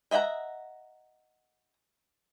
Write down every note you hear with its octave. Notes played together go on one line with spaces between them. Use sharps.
D#5 E5 F#5 G5 A#5